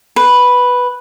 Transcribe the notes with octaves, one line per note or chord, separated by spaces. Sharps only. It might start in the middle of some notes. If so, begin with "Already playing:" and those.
B4